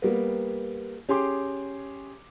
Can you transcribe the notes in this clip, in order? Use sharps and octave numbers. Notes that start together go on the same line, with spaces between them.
G3 A#3 B3
C#4 G4 G#4 C6 D6